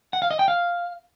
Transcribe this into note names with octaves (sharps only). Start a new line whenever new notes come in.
F#5
F5
D#5
G5
F5